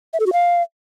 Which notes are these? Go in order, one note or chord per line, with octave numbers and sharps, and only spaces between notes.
E5
A4
F#4
F5